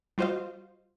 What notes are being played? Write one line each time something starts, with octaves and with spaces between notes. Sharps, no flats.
G3 F4 F#4 C5 D#5 F5